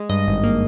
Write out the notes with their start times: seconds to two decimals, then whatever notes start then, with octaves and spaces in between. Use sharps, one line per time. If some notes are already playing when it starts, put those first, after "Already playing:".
Already playing: G#3
0.10 G2 D#5
0.27 G#1
0.44 A#3